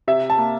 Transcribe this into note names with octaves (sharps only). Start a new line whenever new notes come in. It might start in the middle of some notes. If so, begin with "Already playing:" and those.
C3 E5
A5
A#3